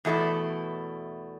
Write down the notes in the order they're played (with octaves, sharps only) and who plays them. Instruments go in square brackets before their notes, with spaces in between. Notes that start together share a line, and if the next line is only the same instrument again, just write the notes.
[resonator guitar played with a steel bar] E2 B2 A3 E4